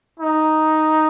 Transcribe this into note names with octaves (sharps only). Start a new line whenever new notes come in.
D#4